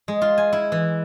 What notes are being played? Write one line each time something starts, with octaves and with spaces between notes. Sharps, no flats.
G#3
F4
G#5
E4
E3